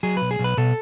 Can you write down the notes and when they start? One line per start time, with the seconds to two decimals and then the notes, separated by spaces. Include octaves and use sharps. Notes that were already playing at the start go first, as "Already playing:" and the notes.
0.03 F#3 G#4
0.17 B1 B4
0.31 G#4
0.39 B1
0.44 B4
0.57 B2 A4